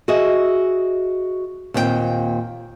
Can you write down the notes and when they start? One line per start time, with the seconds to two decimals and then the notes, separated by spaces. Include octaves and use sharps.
0.08 F#4 G#4 D#5 E5
1.74 D#2 A#2 C4 A4 G5